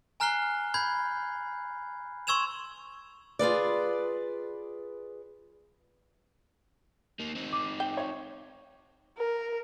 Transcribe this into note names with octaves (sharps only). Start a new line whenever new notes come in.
G#5 A#5 F6 F#6 C7 G7
B5 G6 G#6
C6 C#6 E6 G#6 E7 F7
F4 G#4 B4 D5
A#3 D#4
C4 D#4
D6
G5
C#5
A#4